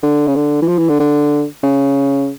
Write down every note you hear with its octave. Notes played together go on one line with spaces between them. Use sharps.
D3
C#3
D3
E3
F3
E3
D3
D3
C#3